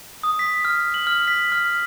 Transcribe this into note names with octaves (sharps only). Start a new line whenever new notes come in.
D#6
B6
F6
F#7
F6
B6
F6